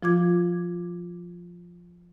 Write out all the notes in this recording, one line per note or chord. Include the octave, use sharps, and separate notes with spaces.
F3 F4 D6 G#6